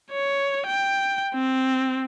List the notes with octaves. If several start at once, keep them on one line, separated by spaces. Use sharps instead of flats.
C#5
G5
C4